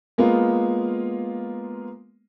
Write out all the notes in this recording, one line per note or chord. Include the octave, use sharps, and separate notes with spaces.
G#3 A#3 B3 F4